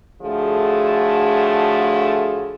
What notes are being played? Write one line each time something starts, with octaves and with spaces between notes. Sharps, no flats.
A2 D3 F3 A3 F#4 G#4